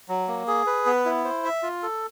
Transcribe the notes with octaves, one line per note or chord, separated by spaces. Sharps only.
F#3
A#3
G#4
B4
B3
E4
C5
E5
F4
A4